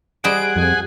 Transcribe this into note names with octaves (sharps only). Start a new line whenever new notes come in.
G3 G#4 C5 D#5 F#5 D7
F2 G#5